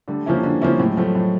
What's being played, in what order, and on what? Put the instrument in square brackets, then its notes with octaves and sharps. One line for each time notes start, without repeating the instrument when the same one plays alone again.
[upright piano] D3 [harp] G3 A3
[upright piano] F3 A#3 C#4 E4
D3
F3 A#3 C#4 E4
[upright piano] A2 [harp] F#3 G#3
[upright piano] F3 A3
A2